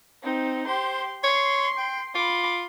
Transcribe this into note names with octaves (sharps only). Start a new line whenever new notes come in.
C4 D#4
G4 C5 C6
C#5 C6 C7
G5
F4 B5 D6